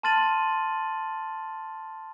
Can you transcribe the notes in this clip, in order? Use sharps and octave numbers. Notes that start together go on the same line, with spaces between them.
A5 C6 F6 A6 D#7 F#7